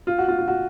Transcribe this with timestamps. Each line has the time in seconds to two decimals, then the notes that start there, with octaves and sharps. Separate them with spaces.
0.07 F4
0.18 F#4
0.28 F4
0.39 F4
0.48 F#4